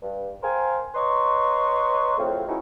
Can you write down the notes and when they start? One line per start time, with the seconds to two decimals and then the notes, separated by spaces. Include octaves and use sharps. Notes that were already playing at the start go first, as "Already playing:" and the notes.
0.02 G2
0.43 A#4 C5 F5 G5 G#5
0.95 B4 C#5 D#5 A#5 C6 C#6
2.18 F2 A2 C#3 F#3 C4 F4
2.48 E3 G#3 C#4 D#4 E4 F#4